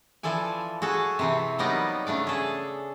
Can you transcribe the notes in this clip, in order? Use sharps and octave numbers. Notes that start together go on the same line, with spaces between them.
E3 F3 A4 D5 G#5
F#4 G#4 A4
C3 E3 C4
F#3 G3 A#3 B3 D#4 D5
C#3 A3 D4 D5
G#4 A4